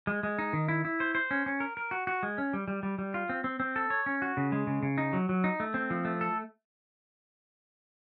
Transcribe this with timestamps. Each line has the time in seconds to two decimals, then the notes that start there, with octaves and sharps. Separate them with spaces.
0.07 G#3
0.23 G#3
0.39 D#4
0.53 D#3
0.68 E4
0.85 E4
1.00 C5
1.15 C5
1.31 C#4
1.46 C#4
1.60 A#4
1.77 A#4
1.91 F#4
2.07 F#4
2.23 G#3
2.38 C#4
2.53 G3
2.68 G3
2.83 G3
2.99 G3
3.14 F4
3.29 C4
3.44 C4
3.60 C4
3.76 A4
3.90 C#5
4.06 C#4
4.22 F#4
4.37 C#3
4.52 G#3
4.67 C#3
4.83 C#3
4.98 D#4
5.13 F#3
5.29 F#3
5.44 D#4
5.60 A3
5.74 C4
5.90 F3
6.05 A3
6.21 A4